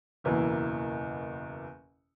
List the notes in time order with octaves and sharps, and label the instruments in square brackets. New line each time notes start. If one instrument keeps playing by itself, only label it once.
[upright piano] F#1 E2 B2 A#3 E4